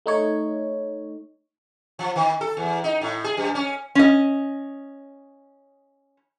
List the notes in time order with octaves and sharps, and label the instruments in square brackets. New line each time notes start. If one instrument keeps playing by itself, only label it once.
[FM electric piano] A3 D#4 C#5
[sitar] F3
D#3
A4
E2
D#4
A2
G#4
F#2
C#4
[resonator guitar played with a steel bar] C#4 D#5